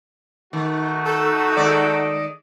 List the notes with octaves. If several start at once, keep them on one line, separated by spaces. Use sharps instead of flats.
D#3 A3 D#4 F#4
A4
D#3 G#3 D5